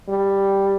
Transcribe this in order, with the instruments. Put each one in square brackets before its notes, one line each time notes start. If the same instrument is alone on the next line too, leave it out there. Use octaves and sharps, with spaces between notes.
[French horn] G3